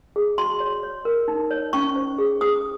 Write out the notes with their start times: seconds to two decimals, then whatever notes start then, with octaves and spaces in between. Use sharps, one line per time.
0.16 G#4
0.38 F#4 C6
0.60 C#5
0.83 C#5
1.05 A#4
1.28 D#4
1.51 C#5
1.73 C#4 C#6
1.96 C5
2.18 G#4
2.41 G#4 D#6